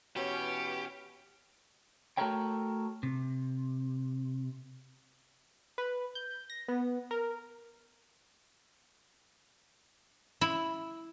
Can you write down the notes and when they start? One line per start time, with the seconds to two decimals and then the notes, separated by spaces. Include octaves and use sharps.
0.17 B2 E3 C#4 G4
2.17 A3 F#4 A4 A#4 C#5 G5
3.03 C3
5.78 B4
6.15 G6
6.50 A#6
6.68 B3
7.11 A#4
10.41 E4